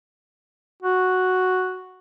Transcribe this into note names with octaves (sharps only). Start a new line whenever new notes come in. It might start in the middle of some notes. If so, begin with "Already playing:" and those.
F#4